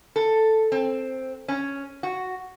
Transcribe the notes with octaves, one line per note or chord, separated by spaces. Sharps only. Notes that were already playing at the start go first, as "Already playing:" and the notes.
A4
C4
C#4
F#4